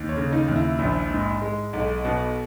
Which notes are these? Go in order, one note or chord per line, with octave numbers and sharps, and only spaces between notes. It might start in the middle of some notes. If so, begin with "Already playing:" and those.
Already playing: D#2
C#5
C#3
D#4
D#2
E4
A#1
G#2
G#3
B1
B2